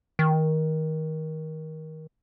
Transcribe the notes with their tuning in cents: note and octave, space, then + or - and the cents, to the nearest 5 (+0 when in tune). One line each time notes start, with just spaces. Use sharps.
D#3 +20